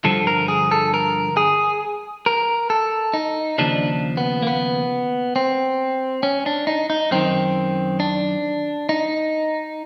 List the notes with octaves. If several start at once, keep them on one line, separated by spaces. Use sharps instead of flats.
G2 D3 F3 A4
A#4
G#4
A4
A#4
G#4
A#4
A4
D#4
D#2 C#3 F3 D4
B3
A#3
B3
C4
C#4
D4
D#4
D#4
F#2 D#3 C4
D4
D#4